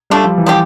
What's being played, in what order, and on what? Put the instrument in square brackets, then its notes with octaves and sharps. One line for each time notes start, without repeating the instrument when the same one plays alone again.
[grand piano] G3 [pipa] A3 D4 F4
[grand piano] F3
E3
[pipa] F3 C4 G4